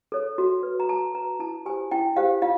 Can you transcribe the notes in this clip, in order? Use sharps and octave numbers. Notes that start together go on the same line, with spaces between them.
A4 C#5
F#4
B4
A#5
F#4 A5
B4 A#5
E4 A5
G4 C5 G#5
E4 G5
G4 C5 F5
F4 F5